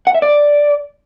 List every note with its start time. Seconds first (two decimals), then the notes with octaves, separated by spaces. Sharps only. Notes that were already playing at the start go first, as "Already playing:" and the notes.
0.07 F#5
0.15 E5
0.22 D5